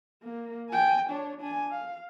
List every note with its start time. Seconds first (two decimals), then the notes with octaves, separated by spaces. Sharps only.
0.23 A#3
0.70 G5 G#5
1.10 D4 C#5
1.41 D4 G#5
1.71 F5